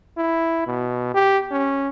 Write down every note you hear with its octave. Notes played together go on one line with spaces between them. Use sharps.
E4
B2
G4
C#4